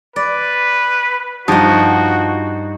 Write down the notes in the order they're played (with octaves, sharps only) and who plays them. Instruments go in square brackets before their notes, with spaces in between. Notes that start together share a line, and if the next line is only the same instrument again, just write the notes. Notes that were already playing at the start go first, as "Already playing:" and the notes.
[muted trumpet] B4 [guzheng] D5
[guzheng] G2 D#4 [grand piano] F3 [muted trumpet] F#4